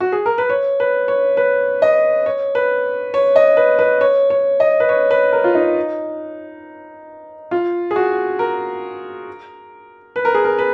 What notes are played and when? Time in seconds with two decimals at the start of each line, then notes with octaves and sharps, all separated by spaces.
0.00 F#4
0.12 G#4
0.26 A#4
0.38 B4
0.49 C#5
0.80 B4
1.08 C#5
1.37 B4
1.82 D#5
2.26 C#5
2.55 B4
3.14 C#5
3.36 D#5
3.57 B4
3.79 B4
4.01 C#5
4.30 C#5
4.60 D#5
4.80 B4
4.89 C#5
5.11 B4
5.32 A#4
5.44 F4
5.55 D#4
7.51 F4
7.91 G#4
7.96 F#4
8.39 A#4
10.16 B4
10.25 A#4
10.34 G#4
10.44 A#4
10.59 B4